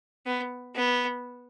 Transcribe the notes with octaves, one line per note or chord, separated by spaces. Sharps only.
B3
B3